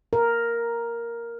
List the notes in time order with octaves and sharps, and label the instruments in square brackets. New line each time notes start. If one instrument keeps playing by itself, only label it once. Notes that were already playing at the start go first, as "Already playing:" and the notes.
[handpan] A#4